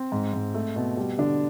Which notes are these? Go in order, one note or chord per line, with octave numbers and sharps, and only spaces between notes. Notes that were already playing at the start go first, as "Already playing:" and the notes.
Already playing: C4
G#2
G#2
A3
B2
G3
D3 D4